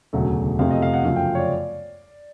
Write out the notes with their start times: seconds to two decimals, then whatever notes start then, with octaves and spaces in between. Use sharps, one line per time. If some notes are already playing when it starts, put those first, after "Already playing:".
0.13 E1 D2 C#3 F#3 A3
0.59 F2 C3 F3 A3 F5
0.71 D#5
0.82 F5
0.94 F#5
1.05 F#2 C#3 F3 A3 F5
1.16 G5
1.35 C#5
1.39 D5